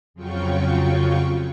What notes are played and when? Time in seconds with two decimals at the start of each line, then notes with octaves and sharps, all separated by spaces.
0.14 F2 C#3 F#3 F4 G5 C#6